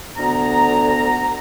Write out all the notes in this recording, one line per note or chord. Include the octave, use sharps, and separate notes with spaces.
D2 D3 B3 A#5